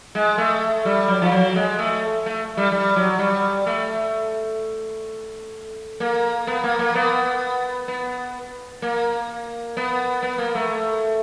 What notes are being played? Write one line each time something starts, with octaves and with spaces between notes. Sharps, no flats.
G#3
A3
G3
F#3
F3
F#3
G#3
A3
A3
G3
G3
F#3
G3
A3
A#3
B3
A#3
A#3
B3
B3
A#3
B3
B3
A#3
A3